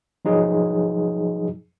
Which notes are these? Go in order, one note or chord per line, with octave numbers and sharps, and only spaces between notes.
F3 F#3 D#4 G#4